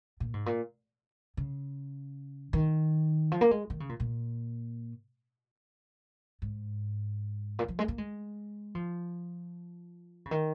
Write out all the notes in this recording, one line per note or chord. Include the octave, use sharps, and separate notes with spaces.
A#2
G#2
A#2
C#3
D#3
F3
A#3
G#3
D#3
C#3
A#2
A#2
G#2
A#2
F3
G#3
A#3
G#3
F3
C#3
D#3